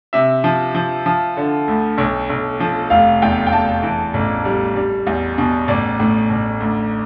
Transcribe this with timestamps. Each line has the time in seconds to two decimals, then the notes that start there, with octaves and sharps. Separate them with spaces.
0.13 C3 E5
0.44 F3
0.75 F3
1.06 F3
1.37 D3
1.68 D2
1.98 B1
2.30 B1
2.60 F3
2.90 F1 F5
3.22 E2 G5
3.47 G5
3.52 E2 A5
3.83 E3
4.14 A1
4.45 G3
4.76 G3
5.07 E2
5.38 B2
5.68 A1 D5
6.00 A2
6.30 A1
6.60 D2